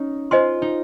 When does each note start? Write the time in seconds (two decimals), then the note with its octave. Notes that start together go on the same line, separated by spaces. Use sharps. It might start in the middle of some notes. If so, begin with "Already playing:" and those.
Already playing: C#4 D#4
0.31 F4 C5 D#5 G#5 C6
0.62 D#4